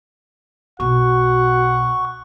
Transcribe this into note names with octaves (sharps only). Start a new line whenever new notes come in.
B1 B2 F#4 F#5 C#6